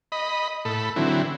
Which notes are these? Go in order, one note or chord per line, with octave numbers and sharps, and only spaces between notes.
D#5 B5
A2 A4 B5
D3 E3 F#3 C4 E4